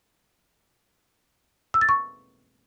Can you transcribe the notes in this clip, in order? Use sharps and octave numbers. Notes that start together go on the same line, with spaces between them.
E6
A6
C#6